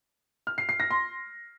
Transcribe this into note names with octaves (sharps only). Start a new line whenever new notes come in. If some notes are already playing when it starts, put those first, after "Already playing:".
F6
C7
C7
A#6
C6